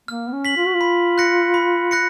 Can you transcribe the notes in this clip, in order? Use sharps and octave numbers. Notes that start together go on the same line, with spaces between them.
A#3 F6
B3
C#4
B6 F#7
F4
F#4
F4
B5
F#6 A#6 C#7
B5
F#6 A#6 C#7